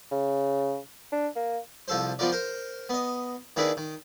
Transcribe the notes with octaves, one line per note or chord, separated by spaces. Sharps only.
C#3
D4
A#3
C2 F3 A4 C5
F3 B3 F4 A#4 D5
A#4 C5
B3 D#5
D#3 A#3 D4 E4 G#4 B4
D#3